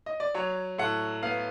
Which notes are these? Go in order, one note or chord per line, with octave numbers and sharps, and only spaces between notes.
D#5
D5
F#3 C#5
A2 F#5
B3 F5